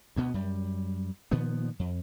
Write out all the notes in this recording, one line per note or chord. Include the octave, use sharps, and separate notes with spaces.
D2 B2 B3
F#2 G3
A#2 D#3 F3 B3
F2